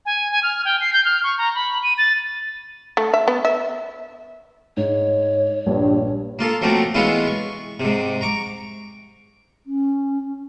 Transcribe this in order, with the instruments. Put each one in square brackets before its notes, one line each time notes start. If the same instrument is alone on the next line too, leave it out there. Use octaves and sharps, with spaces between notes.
[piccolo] G#5
G#5
F6
G5
C7
G6
F6
C#6
A#5
B5
D#7
A6
[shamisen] A3
E5
B3
E5
[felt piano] G#2 [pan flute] C#5
[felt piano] A#1 [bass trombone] G2
[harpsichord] A#3 F4 A4
F3 F#3 A3 A#3 C4
E3 G#3 B3 C#4 E4 F4
C#6
G#2 C3
A#5 C#6 D6
[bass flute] C#4